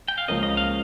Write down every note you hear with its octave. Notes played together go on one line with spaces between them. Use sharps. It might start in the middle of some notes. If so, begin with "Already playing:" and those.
G5
F5
C#2 C#3 F3 A#3 C#4 D#5
D#5
F5